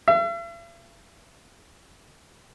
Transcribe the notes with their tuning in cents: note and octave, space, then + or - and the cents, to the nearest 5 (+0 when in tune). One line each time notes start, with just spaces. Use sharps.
E5 +45